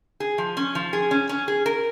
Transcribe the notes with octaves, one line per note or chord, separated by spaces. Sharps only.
G#4
F3
C#4
F3
G#4
C#4
C#4
G#4
A#4